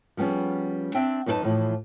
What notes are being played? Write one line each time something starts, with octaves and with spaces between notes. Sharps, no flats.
F3 G3 B3 C#4 G#4
C4 D4 E5 G5
F#2 B3 D#4 A4 B4 A5
A2 E3 F3